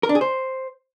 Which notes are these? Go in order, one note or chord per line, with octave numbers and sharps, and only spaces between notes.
A#4
D4
G#4
C5